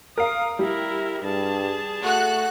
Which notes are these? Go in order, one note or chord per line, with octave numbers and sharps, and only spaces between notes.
A#4 F5 D#6
G3 E4 A#4
G2 G#4 A5
A3 F#4 F#6